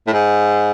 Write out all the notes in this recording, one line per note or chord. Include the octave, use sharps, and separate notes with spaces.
A2
G#2